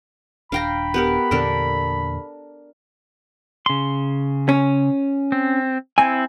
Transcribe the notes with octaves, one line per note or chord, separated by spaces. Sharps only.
D#1 D4 F5 G5 A#5 B5
B3 G4 A#4
E2 A#2 D3 D4 A4 A#4
C#3 C6
C#4
C4
C4 E4 G#5